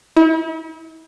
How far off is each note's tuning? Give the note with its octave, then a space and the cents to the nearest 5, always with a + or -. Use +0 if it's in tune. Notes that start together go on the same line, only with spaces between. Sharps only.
E4 -40